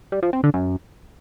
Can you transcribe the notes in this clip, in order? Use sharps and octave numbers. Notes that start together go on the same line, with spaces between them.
G3
F3
C4
D3
F#2